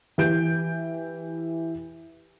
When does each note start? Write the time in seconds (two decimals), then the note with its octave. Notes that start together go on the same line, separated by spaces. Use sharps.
0.18 E3 G4 G6 D7